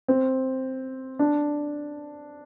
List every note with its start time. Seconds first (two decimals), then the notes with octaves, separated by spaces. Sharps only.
0.08 C4
1.19 D4